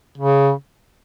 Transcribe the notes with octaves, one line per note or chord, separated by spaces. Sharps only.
C#3